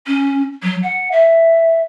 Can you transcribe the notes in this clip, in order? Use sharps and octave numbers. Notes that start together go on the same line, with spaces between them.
C#4
F#3
F#5
E5